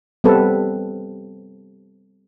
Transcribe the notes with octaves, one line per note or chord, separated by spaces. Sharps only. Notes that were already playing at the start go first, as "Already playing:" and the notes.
G3 B3 C4 A4 B4